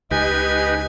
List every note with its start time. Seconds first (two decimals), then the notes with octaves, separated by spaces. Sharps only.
0.11 C#2 D#4 G4 B4 D#5 G#5